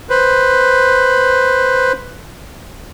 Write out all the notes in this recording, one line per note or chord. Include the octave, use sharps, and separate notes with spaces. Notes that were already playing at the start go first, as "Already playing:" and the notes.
B4 C5